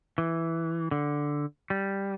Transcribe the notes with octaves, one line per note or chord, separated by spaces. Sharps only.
E3
D3
G3